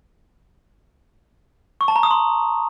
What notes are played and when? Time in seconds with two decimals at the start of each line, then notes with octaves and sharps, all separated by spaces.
1.81 C#6
1.88 A5
1.96 A#5
2.03 D#6
2.11 C6